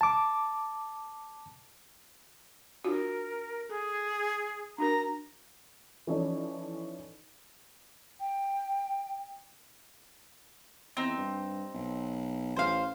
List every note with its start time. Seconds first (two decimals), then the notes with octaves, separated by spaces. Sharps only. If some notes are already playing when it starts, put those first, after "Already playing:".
0.01 A5 D6
2.84 D4 F4 F#4 A#4
3.69 G#4 A4
4.78 D4 F#4 A#4 A#5
6.07 E3 F3 C#4 D#4 A4 D5
8.20 G5
10.97 E2 C4 D#4
11.17 G2
11.74 B1
12.56 A1 C5 F5